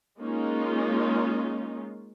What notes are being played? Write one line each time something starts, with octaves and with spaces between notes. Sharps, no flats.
G#3 A#3 C#4 D#4 F4